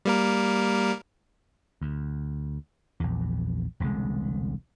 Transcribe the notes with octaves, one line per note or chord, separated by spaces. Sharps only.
G3 A#3 A#4
D2
A#1 E2
E1 C2 D3 G#3